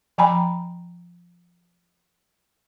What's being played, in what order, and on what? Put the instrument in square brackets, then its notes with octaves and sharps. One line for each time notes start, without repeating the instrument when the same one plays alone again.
[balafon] F3 G5 G#5 A#5 B5